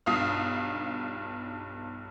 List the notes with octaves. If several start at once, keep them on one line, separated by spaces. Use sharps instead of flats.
B1 G2 F4 F5 D#6 F6